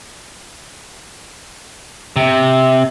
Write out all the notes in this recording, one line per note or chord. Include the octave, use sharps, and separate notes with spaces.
C3